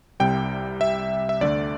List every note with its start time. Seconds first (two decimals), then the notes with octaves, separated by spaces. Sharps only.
0.20 C2 C3 G3 G5
0.81 E5
1.29 E5
1.41 D2 D3 A3 D5